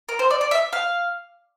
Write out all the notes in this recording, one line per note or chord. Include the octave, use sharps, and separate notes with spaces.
A#4
C5
D5
D5
E5
F5